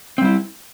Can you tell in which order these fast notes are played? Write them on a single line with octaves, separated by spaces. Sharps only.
C4 G3 E4